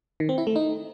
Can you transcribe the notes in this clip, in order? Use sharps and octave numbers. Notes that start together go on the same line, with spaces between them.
D#3
C4
E4
A3
D#4